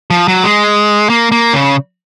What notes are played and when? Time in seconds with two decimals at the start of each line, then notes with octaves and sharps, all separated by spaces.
0.10 F3
0.28 F#3
0.44 G#3
1.10 A#3
1.32 A#3
1.53 C#3